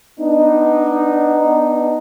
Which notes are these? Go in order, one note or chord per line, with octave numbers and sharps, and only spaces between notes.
B3 D4 D#4